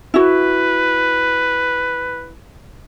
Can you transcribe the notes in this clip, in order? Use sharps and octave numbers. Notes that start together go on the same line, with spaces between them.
E4 F#4 B4